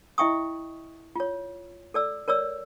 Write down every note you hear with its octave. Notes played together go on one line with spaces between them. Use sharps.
E4 D#5 E5 G5 C#6 D#6
F4 C#5
A4 D5 E6
A#4 C#5 D5 E6